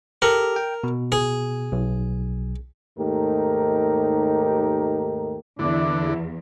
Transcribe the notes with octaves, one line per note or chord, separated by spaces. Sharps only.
G4 A4 A#4
G5
B2
G#4
B1
D#2 G#2 A3 D#4 G4 A#4
E2 D3 D4 E4